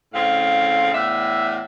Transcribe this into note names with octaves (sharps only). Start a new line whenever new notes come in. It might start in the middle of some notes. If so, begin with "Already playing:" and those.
A2 C#3 C4 F5
E2 A2 D4 E5